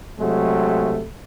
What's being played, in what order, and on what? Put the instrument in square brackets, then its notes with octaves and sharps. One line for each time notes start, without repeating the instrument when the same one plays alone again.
[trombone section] C3 F#3 G#3 A3